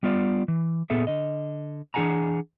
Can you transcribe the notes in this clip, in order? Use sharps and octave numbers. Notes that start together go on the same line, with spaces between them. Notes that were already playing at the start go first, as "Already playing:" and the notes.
G3 B3 F4 D5
E3
A#2 B3 G#4 A4 E5
D3 D#5
E3 D4 G#4 F#5 G#5 A#5